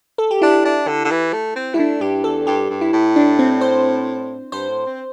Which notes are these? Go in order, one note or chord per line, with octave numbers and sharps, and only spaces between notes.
A4
G4
D4 E4
D4
D3
D3
E3
A3
C4
G3 E4
A3 D4
G2 G4
E2 A4
G2 G4
G2
E4
A2
D4
C4
C5
G2 C5
A2
C4